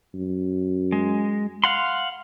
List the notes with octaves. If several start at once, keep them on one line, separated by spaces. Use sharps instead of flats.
F#2
G#3
F5 F#5 C6